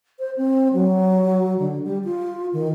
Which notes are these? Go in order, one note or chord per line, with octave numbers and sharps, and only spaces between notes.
C5
C4
F#3
D3
G3
F4
D#3